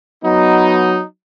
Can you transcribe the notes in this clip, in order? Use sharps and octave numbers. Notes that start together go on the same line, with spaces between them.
F#3 B3 D#4